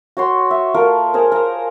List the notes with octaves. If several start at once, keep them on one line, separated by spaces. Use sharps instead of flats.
F#4 C#5 C6
E5
A3 F4 A#4
G#4 A#4 C5
A#4 A#5